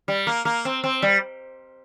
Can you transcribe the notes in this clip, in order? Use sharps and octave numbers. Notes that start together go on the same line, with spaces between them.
G3
A#3
A#3
C4
C4
G3